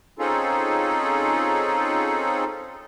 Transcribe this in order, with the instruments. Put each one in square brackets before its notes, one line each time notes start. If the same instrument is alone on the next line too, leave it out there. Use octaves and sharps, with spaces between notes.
[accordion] C4 C#4 D#4 F4 G#4 A4